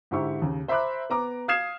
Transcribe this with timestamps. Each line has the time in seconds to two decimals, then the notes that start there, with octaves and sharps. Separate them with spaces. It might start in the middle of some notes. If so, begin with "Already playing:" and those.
0.11 G#2 D3 E4 G4 C#6
0.42 D#2 C#3
0.68 C5 E5 A#5 B5 D6 F#6
1.10 B3 A#5 D6
1.48 F5 D#6 F6 G#6 C7 E7